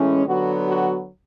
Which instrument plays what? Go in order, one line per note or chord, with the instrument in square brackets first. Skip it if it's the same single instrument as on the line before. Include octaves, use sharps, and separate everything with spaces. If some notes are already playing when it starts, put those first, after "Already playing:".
Already playing: [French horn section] A2 E3 G#3 C#4
D3 F#3 B3 F#4
F#4